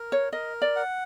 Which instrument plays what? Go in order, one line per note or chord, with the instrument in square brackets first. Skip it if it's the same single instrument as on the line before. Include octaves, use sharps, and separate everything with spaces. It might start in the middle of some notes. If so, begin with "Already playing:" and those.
Already playing: [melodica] A#4
[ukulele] C#5
[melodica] A#4 [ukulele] D#5
[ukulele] D5
[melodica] F#5